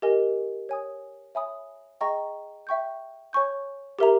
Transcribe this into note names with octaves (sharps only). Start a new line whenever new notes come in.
G4 A#4 D#5 G#5
C#5 G#5 D#6
C#5 E5 G#5 B5 D#6
G#4 D#5 G5 A#5 C#6
E5 G5 C#6 G6
C#5 G#5 C#6 G6
G4 A#4 E5 A#5